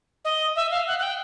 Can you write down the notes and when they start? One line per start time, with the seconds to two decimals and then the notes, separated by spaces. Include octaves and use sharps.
0.24 D#5
0.55 E5
0.70 F5
0.87 F#5
0.99 F#5
1.02 G5